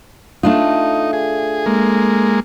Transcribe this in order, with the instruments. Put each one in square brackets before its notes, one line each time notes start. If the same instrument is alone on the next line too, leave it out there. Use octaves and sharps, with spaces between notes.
[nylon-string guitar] A3 D4 F4 [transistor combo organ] D#4
[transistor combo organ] G#4
G#3 A#3